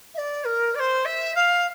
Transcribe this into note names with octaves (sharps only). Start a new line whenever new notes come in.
E5
D5
A#4
D5
C5
E5
F5